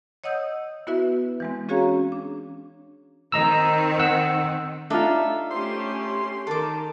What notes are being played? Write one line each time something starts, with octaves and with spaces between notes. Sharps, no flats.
C#5 D#5 F#5 D#6 E6 G6
B3 E4 F#4 B4 E5
E3 G#3 C4
C#4 F#4 G#4 C#5 F5 A#5
D4
D#3 C4 D#5 A#5 E6
F#5 E6
D4 D#4 F4 A4 E5
A3 C#4 G4 C6
D#3 A4 D6